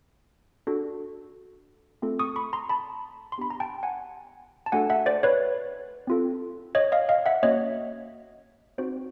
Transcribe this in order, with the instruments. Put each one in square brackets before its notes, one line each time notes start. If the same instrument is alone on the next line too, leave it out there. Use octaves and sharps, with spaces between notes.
[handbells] D4 F#4 A4
A3 C4 F4 A4
C#6 D#6
B5 C#6
A#5 C6
A5 B5
C6
B3 D4 G4 B5
A#5
G5 A5
F#5 G#5
A5
A3 D4 F#4 A4 F#5 G#5
E5 F#5
C5 D5
B4 C#5
C4 F4 A4
C#5 D#5
D#5 F5
D#5 F5
E5 F#5
A#3 C#4 F#4 C#5 D#5
C4 D#4 F#4 C5